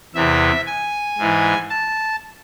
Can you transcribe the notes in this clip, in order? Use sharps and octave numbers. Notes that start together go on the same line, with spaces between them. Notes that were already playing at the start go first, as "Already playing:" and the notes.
E2 C3 E3 E5
G#5
G#2 E3
A5